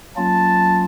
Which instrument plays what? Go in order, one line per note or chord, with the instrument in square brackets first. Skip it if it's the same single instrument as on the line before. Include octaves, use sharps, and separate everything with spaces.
[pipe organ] F#3 A#3 C#4 F4 [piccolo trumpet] A5